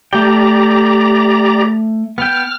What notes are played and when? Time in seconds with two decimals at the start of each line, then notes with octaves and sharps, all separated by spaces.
0.13 A3 G4 D5 G5 A#5
2.18 B3 G5 F6